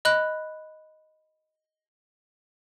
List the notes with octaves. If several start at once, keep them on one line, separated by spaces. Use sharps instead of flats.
D#5 B5 F#6